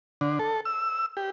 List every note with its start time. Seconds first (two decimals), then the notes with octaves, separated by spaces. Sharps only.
0.21 D3
0.39 A4
0.65 E6
1.17 G4